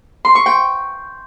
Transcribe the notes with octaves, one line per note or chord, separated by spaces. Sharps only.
C6
C#6
G5